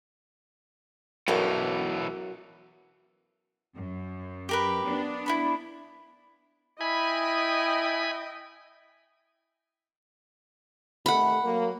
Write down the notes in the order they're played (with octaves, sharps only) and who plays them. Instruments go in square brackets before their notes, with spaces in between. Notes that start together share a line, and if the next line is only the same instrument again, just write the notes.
[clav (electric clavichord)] B1 G2 [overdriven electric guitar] B2 E3 [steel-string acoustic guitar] F#3 C#4 A#4
[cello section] F#2
[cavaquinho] G4 A#4 B4
[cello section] B3 D4
[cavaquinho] E4 A4 B5
[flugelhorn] E4 [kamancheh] D#5 G5 [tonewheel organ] G#5 B5
[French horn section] C3 D#3 A3 [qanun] F#5 B5
[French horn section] F#3 A#3